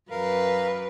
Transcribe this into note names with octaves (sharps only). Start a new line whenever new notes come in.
F#2 A#4 B4 F5